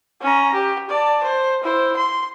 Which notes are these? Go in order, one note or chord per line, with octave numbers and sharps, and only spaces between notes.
C#4 A#5
G4
D5 A5
C5
E4 C5
C6